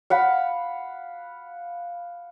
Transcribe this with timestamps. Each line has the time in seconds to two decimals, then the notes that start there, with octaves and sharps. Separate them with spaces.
0.10 F5 F#5 B5